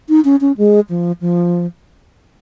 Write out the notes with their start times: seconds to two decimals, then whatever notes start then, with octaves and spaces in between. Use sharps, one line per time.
0.09 D#4
0.25 C#4
0.41 C#4
0.58 G#3
0.89 F3
1.21 F3